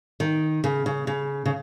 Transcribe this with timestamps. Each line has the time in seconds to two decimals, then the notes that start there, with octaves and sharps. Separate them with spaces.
0.20 D#3
0.64 C#3
0.86 C#3
1.07 C#3
1.45 C#3